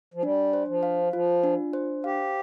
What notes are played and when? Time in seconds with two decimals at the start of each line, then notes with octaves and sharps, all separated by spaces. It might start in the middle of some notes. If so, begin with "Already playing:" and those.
0.14 F3
0.22 G3 D4
0.53 C5
0.68 F3
0.83 F5
1.13 F3 F4
1.44 D4
1.73 C5
2.04 G4 F5